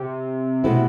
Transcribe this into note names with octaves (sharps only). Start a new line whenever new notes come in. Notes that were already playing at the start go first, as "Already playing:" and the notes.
Already playing: C3
B2 A3 C4 E4